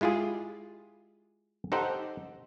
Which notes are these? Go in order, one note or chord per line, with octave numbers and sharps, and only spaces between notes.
G#3 E4 F4 G4 G#4
D#4 G4 A4 C5 F#5